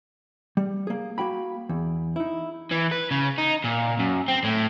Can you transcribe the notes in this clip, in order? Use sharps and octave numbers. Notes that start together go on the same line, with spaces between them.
G3
A#3 G#4
A#3 F#4 G5 B5
E2
D#4 E4
E3
B4
C#3
D#4
A#2
F#2
C4
A2